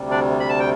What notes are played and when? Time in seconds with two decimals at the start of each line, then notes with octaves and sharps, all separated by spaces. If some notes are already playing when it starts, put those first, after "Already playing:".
Already playing: D2 C3 G3
0.11 D4 D5
0.40 B5
0.49 A5
0.60 G5